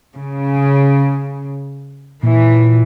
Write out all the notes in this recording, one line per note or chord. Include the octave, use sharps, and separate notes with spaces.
C#3
A#2 E3